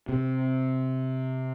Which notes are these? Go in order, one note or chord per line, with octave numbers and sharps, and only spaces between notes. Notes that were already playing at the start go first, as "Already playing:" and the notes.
C3